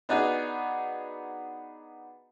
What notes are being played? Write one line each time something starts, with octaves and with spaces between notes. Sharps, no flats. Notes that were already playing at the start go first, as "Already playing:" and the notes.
B3 D4 D#4 F#4 G#4